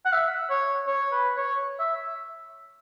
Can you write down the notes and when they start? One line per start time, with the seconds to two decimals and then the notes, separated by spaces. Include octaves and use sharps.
0.05 F#5
0.13 E5
0.50 C#5
0.87 C#5
1.12 B4
1.37 C#5
1.79 E5